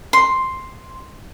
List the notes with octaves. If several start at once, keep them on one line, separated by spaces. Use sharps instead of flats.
C6